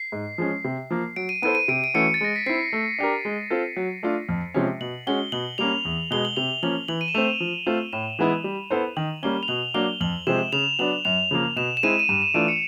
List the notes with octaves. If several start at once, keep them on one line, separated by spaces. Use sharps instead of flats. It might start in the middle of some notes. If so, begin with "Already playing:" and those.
Already playing: C7
G#2
F3 G#3 C#4
C3
F3 A#3
F#3 D7
D#7
B3 E4 A4 C5 D#7
D#7
C3 D7
D7
E3 A3 C#4 F#4 C#7
A6
G#3 A#6
B6
C4 E4 C7
A3
D4 G4 A#4
G#3
C4 F4 A4
F#3
A3 D4 F4
F2
C3 F3 G#3 C#4
B2 F#7
G#3 C#4 F#4 G7
B2 F#7
G3 A#3 C#4 F7
E2
B2 G#3 G7
F#7
C3 F7
F3 A#3 C#4 F#7
E3 F#7
D#7
E7
A3 C4 F7
F3
A3 C4 F4
A2 E7
E3 G#3 B3 E4
G3
B3 E4 A4 C5
D#3 F#7
G3 A#3 C#4 G7
F7
B2 F#7
F#3 A#3 D4 G7
F2 F#7
C3 F3 G#3 C4 E7
C#3 F7
F#3 B3 D4 F#7
F#2 F7
C#3 F3 A#3
B2 E7
E7
G#3 C4 E4 D#7
D#7
G2 E7
E7
E3 A3 D4 F4 D7
C#7